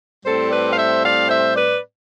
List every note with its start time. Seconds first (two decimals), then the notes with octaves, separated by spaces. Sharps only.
0.24 A2 G3 C4 A4 C5
0.51 B4 D5
0.72 F5
0.77 C5 E5
1.02 D5 F5
1.28 C5 E5
1.55 B4 D5